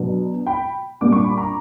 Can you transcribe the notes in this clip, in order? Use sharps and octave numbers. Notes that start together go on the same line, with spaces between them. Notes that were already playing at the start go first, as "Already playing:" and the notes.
Already playing: B2 F#3 B3 D4
G5 B5
A#2 G3 A#3 D4 D6
C#6
B5
A#5 C#6